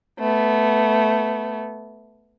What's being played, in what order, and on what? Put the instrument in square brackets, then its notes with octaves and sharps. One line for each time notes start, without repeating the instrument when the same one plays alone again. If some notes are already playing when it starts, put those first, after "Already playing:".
[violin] A3 B3